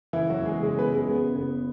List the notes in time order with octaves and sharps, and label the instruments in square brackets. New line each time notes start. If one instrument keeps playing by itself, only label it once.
[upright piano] F#1 E3 E4
F#3 F#4
E2
G#3 G#4
F#1 G#3 G#4
B3 B4
F#1
G#3 G#4
C#3 B3
F#1 B3